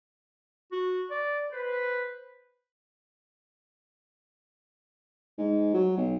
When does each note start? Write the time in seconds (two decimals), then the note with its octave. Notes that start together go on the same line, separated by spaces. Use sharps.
0.72 F#4
1.11 D5
1.52 B4 C5
5.38 G#2
5.74 F#3
5.97 B1